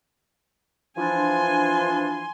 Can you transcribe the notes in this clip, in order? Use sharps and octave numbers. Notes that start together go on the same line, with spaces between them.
E3 F3 D4 G#5 C6